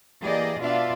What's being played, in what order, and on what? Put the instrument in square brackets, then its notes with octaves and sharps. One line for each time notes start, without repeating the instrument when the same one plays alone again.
[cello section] E3 A#3 G4 G#4 D5 D#5
B2 D4 F4 D5 E5 F5